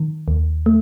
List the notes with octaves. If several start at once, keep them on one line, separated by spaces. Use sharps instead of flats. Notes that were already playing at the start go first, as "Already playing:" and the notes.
Already playing: D#3
D#2
A3